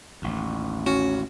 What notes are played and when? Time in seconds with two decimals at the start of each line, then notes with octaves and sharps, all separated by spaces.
0.22 A1 D#2
0.87 C#4 F#4